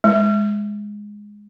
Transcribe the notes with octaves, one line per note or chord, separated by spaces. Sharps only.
G#3